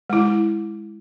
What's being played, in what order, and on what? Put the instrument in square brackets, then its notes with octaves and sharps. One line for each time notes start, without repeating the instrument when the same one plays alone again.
[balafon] G#3 E4